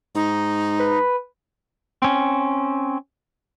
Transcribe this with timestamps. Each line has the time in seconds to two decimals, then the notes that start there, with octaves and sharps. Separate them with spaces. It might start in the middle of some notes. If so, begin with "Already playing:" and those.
0.15 G#2 D#4
0.80 B4
2.02 C4 C#4